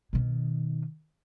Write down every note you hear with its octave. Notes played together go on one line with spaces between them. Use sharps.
B2 D#3